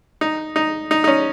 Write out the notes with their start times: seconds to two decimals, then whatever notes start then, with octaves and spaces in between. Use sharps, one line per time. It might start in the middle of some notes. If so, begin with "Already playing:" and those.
0.21 D#4
0.56 D#4
0.91 D#4
1.04 D#4
1.08 C#4